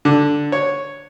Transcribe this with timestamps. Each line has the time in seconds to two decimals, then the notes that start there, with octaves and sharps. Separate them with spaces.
0.05 D3
0.52 C#5